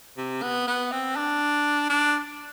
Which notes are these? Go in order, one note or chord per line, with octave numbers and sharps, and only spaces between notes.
C3
B3
B3
C4
D4
D4